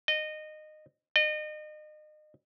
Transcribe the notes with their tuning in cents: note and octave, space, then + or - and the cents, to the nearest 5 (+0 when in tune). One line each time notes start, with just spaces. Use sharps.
D#5 -20
D#5 -35